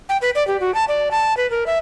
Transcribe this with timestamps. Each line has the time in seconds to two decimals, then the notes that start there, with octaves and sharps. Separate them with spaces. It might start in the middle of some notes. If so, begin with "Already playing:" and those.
0.09 G5
0.22 B4
0.35 D5
0.47 G4
0.60 F#4
0.74 A5
0.88 D5
1.11 A5
1.37 B4
1.50 A#4
1.66 E5